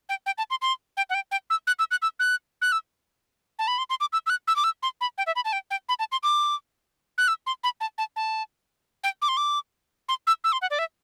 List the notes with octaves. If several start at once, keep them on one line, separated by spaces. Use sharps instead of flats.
G5
G5
A5
C6
C6
G5
F#5
G5
G5
E6
F#6
E6
F#6
E6
F#6
F#6
E6
A5
B5
C6
C6
D6
E6
E6
F#6
E6
D6
E6
C6
B5
G5
E5
B5
A5
G5
G5
B5
A5
C6
D6
F#6
E6
C6
B5
A5
A5
A5
G5
D6
C6
D6
C6
E6
E6
C6
F#5
D5
E5